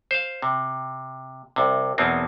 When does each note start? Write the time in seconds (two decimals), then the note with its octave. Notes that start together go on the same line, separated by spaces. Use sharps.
0.11 C5 F5
0.42 C3
1.56 C2 C3
1.98 E2 B2 F#3 A#3 C4 D#4